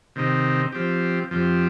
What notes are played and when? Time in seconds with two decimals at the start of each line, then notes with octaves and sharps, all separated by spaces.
0.16 C3 D#3 C4 D#4
0.72 F3 C4 G4
1.31 F2 F3 C4 G4